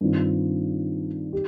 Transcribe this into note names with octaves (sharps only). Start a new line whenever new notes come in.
G2 D#3 C4 F4
G4